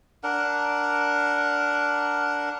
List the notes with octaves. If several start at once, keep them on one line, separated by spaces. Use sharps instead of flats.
D4 A#4 F#5